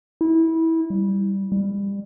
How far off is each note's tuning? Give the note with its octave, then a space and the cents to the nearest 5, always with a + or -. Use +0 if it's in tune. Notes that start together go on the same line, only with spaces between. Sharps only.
E4 -20
G3 +0
G3 +25